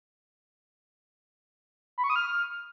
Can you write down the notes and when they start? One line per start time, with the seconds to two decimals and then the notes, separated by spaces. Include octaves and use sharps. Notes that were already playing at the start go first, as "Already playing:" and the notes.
1.98 B5
2.04 C#6
2.10 D#6
2.16 F6